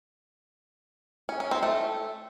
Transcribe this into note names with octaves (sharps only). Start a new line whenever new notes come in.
C#4
C#4
C4
A3